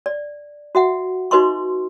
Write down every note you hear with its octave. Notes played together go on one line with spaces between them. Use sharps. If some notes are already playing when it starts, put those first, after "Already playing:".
D5
F#4 E5 F#5
D#4 F#4 B4 D#5 C6 C#6